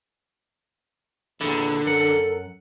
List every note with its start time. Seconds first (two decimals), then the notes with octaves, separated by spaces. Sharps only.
1.41 E2 A#2 D3 D#3 E4
1.86 F#2 A4 A#4 F#5